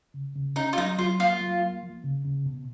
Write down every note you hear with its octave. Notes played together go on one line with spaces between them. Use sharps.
C#3
C#3
C#4 D#4
F4
F#3 D#4
F#3 F4
A#3 F4
F#3
A#3
F3
C#3
C#3
B2